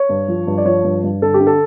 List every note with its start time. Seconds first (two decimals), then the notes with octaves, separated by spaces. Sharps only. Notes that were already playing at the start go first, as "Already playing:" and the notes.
Already playing: C#5
0.09 G2
0.28 F3
0.47 G2
0.58 D5
0.65 F3 C#5
0.84 G2
1.03 G2
1.22 D3 A4
1.34 G4
1.40 D3
1.47 A4